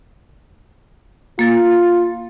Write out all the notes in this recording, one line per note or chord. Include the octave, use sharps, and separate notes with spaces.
A#3 F4 A6